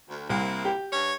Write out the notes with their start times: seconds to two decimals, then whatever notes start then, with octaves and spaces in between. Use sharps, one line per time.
0.09 D2
0.29 C2 A#3 C4 E4
0.65 G4
0.92 G2 C#5